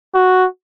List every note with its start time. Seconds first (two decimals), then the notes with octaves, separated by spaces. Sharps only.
0.15 F#4